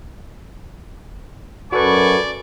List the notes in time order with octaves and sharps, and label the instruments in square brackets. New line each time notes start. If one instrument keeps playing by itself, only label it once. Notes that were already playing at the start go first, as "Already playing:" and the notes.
[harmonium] F#2 [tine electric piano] F#4 A4 B4 [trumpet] D5 [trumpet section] G#5 B5 C#6